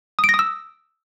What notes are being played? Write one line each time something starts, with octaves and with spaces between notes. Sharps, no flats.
D#6
D7
A#6
D#6
E6